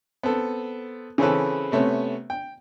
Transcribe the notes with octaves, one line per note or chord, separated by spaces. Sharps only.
B3 C4 A4
C#3 E3 C4 C#4 A4 B4
C3 A3 B3 C#4
G5